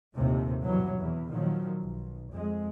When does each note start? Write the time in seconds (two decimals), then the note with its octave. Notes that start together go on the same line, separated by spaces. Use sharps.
0.16 A#1 D#2 A2 C3
0.64 G2 B2 E3 F#3
0.99 E2 E3
1.29 A#2 D#3 F3 F#3
1.81 B1
2.32 F2 G#3